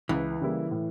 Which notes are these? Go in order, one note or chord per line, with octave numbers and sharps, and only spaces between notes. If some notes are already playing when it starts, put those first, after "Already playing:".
C#2 E3
C#3 G3 A#3 E4
A2